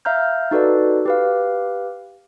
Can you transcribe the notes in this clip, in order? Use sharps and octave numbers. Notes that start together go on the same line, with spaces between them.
E5 F5 A#5 F6 G6
D#4 F#4 A4 B4 D5
G4 B4 F5